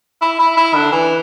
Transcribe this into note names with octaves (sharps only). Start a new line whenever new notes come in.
E4
E4
E4
D3
E3